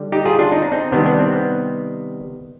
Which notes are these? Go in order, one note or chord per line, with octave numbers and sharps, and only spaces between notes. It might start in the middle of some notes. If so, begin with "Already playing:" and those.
Already playing: D3 G3
D#4 G4
F4 G#4
D4 F4
D#4
D4
C4 D#4
C3 D#3 G3 B3 D4
B3 D4
C4
B3